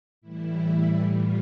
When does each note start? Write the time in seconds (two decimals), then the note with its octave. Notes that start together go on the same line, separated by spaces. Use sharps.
0.21 A2 E3 G3 E4
1.10 F4